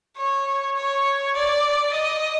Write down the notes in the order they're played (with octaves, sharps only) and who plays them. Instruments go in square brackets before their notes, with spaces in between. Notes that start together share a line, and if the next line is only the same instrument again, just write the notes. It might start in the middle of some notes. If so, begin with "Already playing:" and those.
[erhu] C#5
C#5
D5
D#5